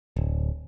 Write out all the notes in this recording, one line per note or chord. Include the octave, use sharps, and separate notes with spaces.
D1